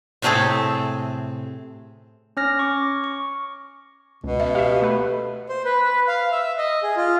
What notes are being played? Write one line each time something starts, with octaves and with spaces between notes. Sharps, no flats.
A2 C3 A3 C4 G#4 A4
C#4 C#5 F6 A#6
C#6 D6
C#6
C#2 B2
E5
G4 E5 F5
A3 B4
C5
B4
B4
F5
E5
D#5
G#4
F4